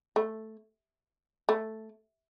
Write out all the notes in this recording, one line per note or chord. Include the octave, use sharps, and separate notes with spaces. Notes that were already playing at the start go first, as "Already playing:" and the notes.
A3
A3